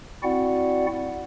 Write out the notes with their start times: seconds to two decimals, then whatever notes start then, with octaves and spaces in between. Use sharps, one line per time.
0.23 C4 E4 F#4 D5 F#5